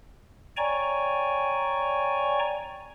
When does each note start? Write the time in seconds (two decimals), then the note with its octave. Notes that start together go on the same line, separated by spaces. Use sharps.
0.57 C#5 D5 G5 G#5 A#5 C#6